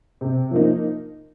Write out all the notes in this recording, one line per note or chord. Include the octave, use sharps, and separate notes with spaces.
C3
F3 A#3 D#4